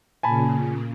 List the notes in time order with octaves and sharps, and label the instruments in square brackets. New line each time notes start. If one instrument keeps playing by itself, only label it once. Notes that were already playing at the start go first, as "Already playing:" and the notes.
[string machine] A#2 C#3 [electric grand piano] G#5 A5 B5